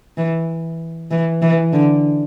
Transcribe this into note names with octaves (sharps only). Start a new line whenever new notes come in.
E3
E3
E3
D3